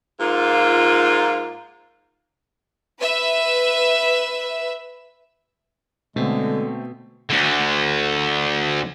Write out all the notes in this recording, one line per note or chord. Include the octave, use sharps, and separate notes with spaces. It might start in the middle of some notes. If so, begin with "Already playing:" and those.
G#2 A#3 F4
B4 E5
B2 D3 G#3 A3 C4
D2 D3